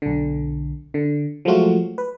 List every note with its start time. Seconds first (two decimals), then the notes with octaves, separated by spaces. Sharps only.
0.02 B1 D3
0.94 D3
1.45 F3 F#3 G#3 A3 F4 F#4
1.98 B4